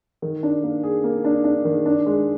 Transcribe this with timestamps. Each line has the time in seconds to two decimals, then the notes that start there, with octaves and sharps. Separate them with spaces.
0.22 D#3
0.43 D4
0.63 A#3
0.84 G#4
1.04 A#3
1.24 D4
1.44 D4
1.65 D#3
1.86 D4
2.06 G#3